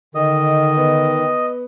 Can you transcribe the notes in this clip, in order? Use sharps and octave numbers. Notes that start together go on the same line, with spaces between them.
D3 D#3 D#5
B3